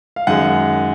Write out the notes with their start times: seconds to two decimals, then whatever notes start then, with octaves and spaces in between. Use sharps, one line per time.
0.16 F5
0.27 F#2 D#3 G#3 F#5